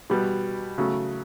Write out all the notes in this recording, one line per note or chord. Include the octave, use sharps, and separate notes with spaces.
B2 G3 B3
C#3 F#3 A3